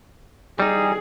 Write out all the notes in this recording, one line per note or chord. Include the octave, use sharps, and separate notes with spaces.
G3 D#4 G#4